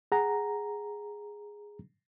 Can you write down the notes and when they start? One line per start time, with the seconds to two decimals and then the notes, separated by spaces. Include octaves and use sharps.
0.12 G#4 F#5 A#5